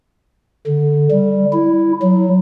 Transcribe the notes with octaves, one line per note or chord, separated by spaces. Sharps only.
D3
G3
E4
F#3